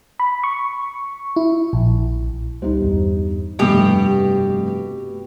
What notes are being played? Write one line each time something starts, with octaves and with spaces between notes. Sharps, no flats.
B5
C#6
E4
A#1
C#2 G3 D#4 C5
E2 G2
F1 G2 B2 A3 G4